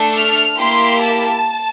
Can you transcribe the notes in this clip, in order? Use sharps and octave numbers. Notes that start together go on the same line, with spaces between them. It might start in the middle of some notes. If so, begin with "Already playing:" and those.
Already playing: A3 D4 A4
F6
A#3 E4 G4 C6
A5